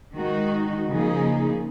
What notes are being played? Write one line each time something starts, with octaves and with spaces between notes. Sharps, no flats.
D#3 G#3 D#4 F#4
C#3 F3 A#3 D#4 G#4